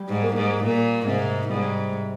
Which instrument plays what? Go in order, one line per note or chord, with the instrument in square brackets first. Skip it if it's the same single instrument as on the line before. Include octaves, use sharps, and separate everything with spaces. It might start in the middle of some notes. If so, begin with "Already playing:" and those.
Already playing: [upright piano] G3
[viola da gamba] G#2
[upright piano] A#3
[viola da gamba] G#2
[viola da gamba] A#2 [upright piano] A#3
[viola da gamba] G#2 [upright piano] C3
[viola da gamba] G#2 [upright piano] G3